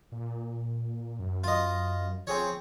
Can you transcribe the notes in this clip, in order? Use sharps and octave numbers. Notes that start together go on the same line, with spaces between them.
A#2
F#2
F4 D#5
F3 C4 G#4 C#5